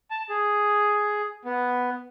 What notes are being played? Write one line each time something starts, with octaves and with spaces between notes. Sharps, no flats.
A5
G#4
B3